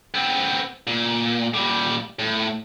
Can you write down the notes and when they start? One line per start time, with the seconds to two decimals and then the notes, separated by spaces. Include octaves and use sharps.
0.14 B3 C4
0.87 A#2
1.54 A#2 G3
2.19 A2